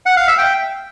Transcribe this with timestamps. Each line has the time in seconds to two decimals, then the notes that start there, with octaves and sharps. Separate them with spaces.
0.06 F#5
0.17 F5
0.27 E5
0.38 G5